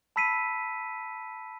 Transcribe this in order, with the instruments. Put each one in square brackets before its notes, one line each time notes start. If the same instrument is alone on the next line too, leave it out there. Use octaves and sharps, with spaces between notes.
[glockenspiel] A5 B5 E6 B6 C7 D#7